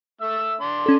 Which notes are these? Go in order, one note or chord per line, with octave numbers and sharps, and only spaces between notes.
A3 E5 E6
D4 C6
C#4 A4